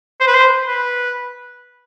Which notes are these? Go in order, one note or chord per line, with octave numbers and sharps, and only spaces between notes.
C5
B4
C5
B4